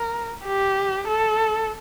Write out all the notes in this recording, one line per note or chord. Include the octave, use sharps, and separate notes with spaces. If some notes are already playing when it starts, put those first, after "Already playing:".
Already playing: A#4
G4
A4